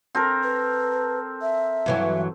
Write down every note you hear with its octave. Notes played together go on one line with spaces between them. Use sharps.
C4 A4 A#4
B4
E5
G2 E3 F#3